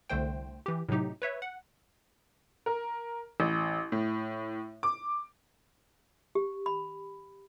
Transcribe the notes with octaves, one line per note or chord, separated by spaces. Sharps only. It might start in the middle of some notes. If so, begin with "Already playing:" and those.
C2 D3 A3 C5 G5
E3 G4
A2 C3 F#3 D#4 G4
B4 C#5 E5
F#5
A#4
A1
A2
D6
G4
B5